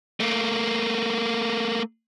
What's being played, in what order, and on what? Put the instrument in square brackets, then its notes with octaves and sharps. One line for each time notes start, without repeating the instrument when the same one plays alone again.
[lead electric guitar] A3 A#3